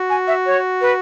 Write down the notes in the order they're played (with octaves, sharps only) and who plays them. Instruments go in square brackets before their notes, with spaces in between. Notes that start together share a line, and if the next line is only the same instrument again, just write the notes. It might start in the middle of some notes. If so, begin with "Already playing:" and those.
Already playing: [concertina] F#4
[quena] G#5
E5
C#5
B4